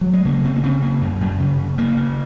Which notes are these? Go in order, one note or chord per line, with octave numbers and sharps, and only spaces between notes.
F#3
G#3
C#3 A#3
C#3 C4
A#3
C#3 C4
C#3 A#3
F#2
F#2
C#3
C#3
C#3 A#3
C#3